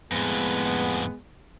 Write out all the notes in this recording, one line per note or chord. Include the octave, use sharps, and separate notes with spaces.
F2 A2 G#3 B3